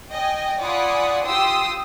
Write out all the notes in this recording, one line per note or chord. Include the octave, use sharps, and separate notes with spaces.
D#5 G5 G#5
F4 D5 F#5 G#5 B5 D#6
F4 G4 G5 C6 D#6 E6